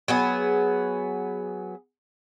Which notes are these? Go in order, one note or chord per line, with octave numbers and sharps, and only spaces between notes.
F#3 B3 G#4